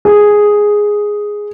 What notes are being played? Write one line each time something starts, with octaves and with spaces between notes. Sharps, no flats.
G#4